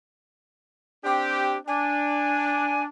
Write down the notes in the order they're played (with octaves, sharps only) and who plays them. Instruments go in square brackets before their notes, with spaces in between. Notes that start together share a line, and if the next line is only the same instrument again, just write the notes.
[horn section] C4 D4 G4
[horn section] D4 [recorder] G#5